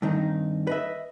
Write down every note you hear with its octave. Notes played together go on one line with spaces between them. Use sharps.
G2 D#3 C4 D#4
B4 D#5 E5